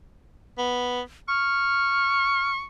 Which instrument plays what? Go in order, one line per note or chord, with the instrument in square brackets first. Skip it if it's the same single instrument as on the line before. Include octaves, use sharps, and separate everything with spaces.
[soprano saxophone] B3
[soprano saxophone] C#6 [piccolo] F6